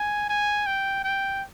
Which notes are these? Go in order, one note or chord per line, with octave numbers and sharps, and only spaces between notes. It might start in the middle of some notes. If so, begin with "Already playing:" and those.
Already playing: G#5
G#5
G5
G5